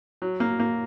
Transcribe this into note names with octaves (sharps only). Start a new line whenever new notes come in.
F#3
A#3
A#3